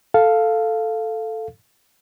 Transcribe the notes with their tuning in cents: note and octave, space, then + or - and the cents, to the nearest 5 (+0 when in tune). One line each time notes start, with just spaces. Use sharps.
A4 +0 F5 +0